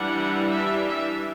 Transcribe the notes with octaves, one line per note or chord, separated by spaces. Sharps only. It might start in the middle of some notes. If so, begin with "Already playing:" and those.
Already playing: E3 G3 D4 F#5
E5
E5